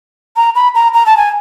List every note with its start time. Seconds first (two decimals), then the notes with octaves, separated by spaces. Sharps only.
0.37 A#5
0.55 B5
0.75 A#5
0.94 A#5
1.06 A5
1.17 G#5